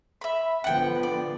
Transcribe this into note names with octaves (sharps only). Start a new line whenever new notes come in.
E5 B5
D3 F3 B3 F#5 G5
D5